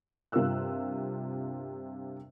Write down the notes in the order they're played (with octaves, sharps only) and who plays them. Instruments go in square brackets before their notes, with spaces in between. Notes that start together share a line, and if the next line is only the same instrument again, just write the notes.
[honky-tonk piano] G2 C3 F4 A#4 E6 F#6